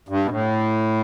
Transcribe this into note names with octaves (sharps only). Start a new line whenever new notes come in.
G2
B2
A2